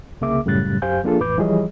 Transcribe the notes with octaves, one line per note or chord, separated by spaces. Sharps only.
C2 C#3 A#3 G#4 E5 D6
F#2 A2 C#3 G3 F#6 A6
F#2 G4 C5 F5 G#5 G6
F3 A#3 D4 F4 G#4 A4
F2 A2 E3 B4 D6 G6
E3 F3 G3 G#4 C#5 D#5